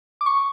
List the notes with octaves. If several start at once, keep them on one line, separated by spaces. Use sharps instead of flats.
D6
C#6